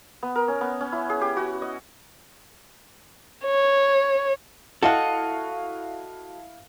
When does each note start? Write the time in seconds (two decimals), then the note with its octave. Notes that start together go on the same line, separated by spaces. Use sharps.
0.23 B3
0.36 A#4
0.48 C#4
0.61 B3
0.81 C#4
0.92 E4
1.10 G#4
1.21 G4
1.37 F#4
1.62 D#5
3.45 C#5
4.83 E4 F#4 A4 D#5 F5 F#5